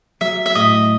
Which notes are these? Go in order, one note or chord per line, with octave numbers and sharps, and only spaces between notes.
F#3 E5
E5
A2 D#5